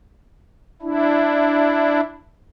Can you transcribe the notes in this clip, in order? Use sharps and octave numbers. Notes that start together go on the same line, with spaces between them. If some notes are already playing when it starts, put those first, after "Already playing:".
D4 E4